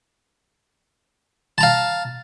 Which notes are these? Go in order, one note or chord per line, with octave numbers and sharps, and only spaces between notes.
F5 A5 A#5